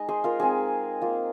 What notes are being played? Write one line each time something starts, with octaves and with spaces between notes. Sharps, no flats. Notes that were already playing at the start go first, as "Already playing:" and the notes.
Already playing: G#3 D#4 D#5
G#4 C5
F4 A#4
G#3 C4 D#4 G#4
A#3 F4